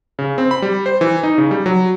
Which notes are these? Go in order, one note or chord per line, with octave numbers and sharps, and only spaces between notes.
C#3
C4
B5
G3
C5
E3
D#4
C#3
G3
F#3